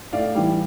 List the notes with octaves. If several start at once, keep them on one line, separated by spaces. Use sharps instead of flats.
A2 D5 F5
E3 G3